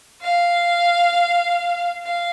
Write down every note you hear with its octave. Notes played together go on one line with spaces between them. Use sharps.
F5
F5